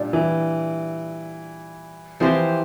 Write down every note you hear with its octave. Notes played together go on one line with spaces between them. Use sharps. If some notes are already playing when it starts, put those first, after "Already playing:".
Already playing: A#2 G3 D4
E3
E3 F3 C4 G4 C5